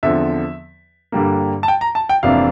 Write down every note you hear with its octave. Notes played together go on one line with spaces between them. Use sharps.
E2 D3 F3 C4 E5
G2 D3 G3 A#3
A5
G5
A#5
A5
G5
F1 F2 E3 A#3 D4 F5